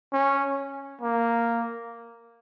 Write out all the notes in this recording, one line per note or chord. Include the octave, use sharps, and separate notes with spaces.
C#4
A#3